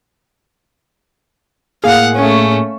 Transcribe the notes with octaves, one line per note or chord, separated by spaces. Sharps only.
A2 A#3 G#4 F5 F#5
A3 C#4